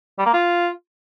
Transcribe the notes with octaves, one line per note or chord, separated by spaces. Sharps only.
G3
A#3
F4